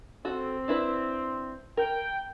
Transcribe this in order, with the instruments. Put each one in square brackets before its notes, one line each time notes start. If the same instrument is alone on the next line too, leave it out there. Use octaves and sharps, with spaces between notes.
[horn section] C4 [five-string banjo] F#4 A4
[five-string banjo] D4 E4 B4
[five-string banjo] A#4 [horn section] G5